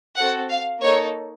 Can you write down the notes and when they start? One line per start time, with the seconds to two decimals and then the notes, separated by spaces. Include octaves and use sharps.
0.17 C4 F#4 A4 F#5
0.50 F5
0.83 A#3 D#4 A4 C#5